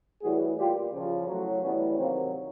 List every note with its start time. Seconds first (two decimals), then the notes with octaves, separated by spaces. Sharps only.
0.22 A2 E3 G3 F#4 G#4
0.57 A#2 G3 F4 G4
0.92 C#3 F3
1.27 A2 F#3
1.62 A2 E3 G3 B3 C#4
1.97 C3 D#3 F#3 A#3 C4